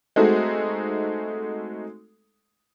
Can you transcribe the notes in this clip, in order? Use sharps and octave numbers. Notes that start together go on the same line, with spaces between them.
G#3 A3 C4 D#4 F#4 A4